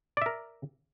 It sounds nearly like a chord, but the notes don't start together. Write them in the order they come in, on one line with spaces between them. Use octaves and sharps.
D5 E5 A#4